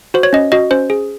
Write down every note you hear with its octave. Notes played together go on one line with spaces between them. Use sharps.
F#4 C5
C#5
C#4 D#5
F#4 D#5
C#4 C5
G#4